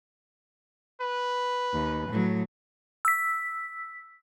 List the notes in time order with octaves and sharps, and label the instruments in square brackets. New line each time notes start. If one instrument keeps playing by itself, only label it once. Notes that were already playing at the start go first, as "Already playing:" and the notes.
[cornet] B4
[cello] D#2
A2 F#3
[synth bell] E6 B6